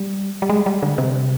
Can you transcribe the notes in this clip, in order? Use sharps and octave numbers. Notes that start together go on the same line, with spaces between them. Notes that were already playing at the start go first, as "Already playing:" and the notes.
Already playing: G3
G3
G#3
G3
D3
C3